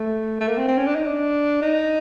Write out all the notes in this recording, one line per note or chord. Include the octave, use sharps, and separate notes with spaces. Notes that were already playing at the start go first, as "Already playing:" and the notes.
Already playing: A3
A3
A#3
C4
C4
C#4
D4
D#4
D4
D#4